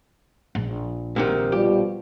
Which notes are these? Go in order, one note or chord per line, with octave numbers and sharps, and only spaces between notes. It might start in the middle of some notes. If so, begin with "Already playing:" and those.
A#1
G#2 C3 D#3
B2 F3 G3 G4